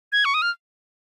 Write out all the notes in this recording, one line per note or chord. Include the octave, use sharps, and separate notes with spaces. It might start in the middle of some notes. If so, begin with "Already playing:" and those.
G#6
C#6
D#6
F6